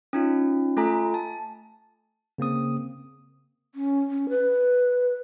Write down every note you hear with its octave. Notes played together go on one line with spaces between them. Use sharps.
C#4 D#4 F4
A3 F4 A4 G#5 A#5
A5
C#3 A#3 C4 D#6
C#4
C#4
B4